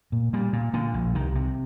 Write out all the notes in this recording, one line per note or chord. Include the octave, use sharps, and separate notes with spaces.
A#2
A#2 G3
A#2
A#2 D3
A#1
C2 D#3
C3